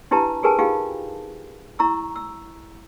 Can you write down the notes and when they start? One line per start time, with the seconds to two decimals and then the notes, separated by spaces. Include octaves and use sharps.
0.11 D4 E4 G4 B4 A5 A#5
0.43 G4 G#4 A#4 B4 G#5 A5
0.59 D#4 F4 G4 G#4 F5 G5
1.79 E4 A#5 C#6 E6
2.16 E6